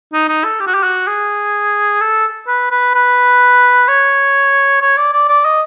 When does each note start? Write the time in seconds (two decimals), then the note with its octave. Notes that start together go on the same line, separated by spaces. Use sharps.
0.13 D#4
0.29 D#4
0.44 A4
0.60 G4
0.67 F#4
0.74 G4
0.83 F#4
1.07 G#4
2.01 A4
2.47 B4
2.71 B4
2.94 B4
3.88 C#5
4.82 C#5
4.97 D5
5.13 D5
5.29 D5
5.45 D#5